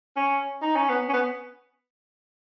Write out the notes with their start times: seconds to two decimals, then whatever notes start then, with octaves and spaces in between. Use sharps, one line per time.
0.16 C#4
0.62 D#4
0.76 C#4
0.90 B3
1.09 C#4
1.13 B3